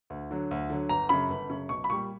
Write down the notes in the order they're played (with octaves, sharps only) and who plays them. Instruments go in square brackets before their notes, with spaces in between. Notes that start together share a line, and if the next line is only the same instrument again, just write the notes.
[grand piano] D2
D3 F#3
D2
D3 F#3
G1 A#5
F#2 C#3 B5
G1
F#2 C#3
B1 C#6
B5
A#2 G3 C#6